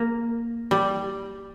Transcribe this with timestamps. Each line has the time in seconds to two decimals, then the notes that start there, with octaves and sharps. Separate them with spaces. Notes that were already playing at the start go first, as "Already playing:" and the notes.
Already playing: A#3
0.71 G3